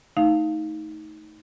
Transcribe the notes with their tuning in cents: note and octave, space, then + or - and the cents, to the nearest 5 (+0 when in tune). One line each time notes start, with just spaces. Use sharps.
A3 +0 D#4 +15 F5 +0